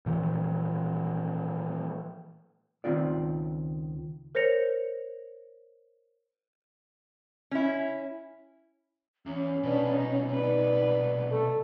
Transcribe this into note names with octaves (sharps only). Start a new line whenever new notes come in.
A#2 E3 F3
C#2 D#3 C4 F4 D5
A#4 C5 C#5 A#6 C#7 F7
C#4 E4
E2 C#4
C2 B2 D4 B4
D#4
D#4 B4 D5
A3 A4